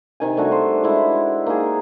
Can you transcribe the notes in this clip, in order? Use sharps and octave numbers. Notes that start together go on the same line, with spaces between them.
C3 D#3 G#5
G3 A3 D4 F#4
C5
G#3 E4
A#3 D#4 G#4